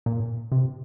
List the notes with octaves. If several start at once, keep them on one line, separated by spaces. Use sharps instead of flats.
A#2
C3